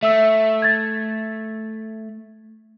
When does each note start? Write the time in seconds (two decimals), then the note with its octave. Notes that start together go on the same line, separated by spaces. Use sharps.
0.03 A3 E5 E6
0.62 G#6 A6